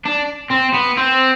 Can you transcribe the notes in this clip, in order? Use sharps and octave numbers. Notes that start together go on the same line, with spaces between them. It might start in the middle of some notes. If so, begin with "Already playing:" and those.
D4
C4
B3
C4